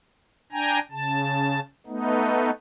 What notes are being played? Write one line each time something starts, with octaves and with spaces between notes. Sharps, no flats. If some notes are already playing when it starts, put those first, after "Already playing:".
D4 G5 G#5 A#5
C#3 A5
A3 B3 D#4